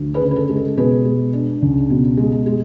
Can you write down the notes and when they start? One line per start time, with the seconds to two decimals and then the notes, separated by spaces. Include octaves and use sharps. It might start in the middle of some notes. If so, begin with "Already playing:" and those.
Already playing: D2
0.14 G#4 B4
0.21 C#3
0.31 B4
0.36 A4
0.49 G#3
0.56 A4
0.77 B2 G#4 B4
1.05 G#3
1.33 D4
1.62 C#2
1.90 B2
2.17 G#3
2.46 G#3